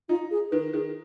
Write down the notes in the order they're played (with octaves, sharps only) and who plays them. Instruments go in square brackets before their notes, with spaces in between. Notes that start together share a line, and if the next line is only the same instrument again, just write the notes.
[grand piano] D#4 [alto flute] F4
[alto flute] G#4
[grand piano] D#3 [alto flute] B4
[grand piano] D#3 [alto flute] G#4